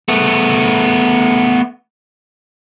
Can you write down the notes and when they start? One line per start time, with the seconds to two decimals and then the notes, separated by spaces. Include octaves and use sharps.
0.08 A3 B3